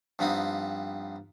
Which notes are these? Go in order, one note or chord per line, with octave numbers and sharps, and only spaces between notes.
G2 F3 B3 C4 D#4